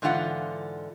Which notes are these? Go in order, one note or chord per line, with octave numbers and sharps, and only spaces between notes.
G#2 D3 E3 F4 F#5